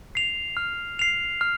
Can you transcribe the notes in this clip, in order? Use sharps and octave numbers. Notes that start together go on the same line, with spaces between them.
C7 F7
F6
C7 F7
F6